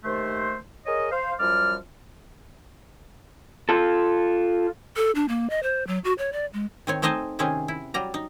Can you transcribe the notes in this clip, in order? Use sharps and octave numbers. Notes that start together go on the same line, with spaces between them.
D#2 A3 C5
G#4 A#4 C#5 D#5
C5 F5
F#2 F3 G3 D5 F6
F4 A4
A4
D4
A#3
D#5
C5
F#3
F#4
C#5
D5
G#3
D#3 C4 C#5
A3 C4 D#4 C5 D#5 G#5
C3 D#3 C4 C#4 G#4
E4
F#3 G3 A#5
D#4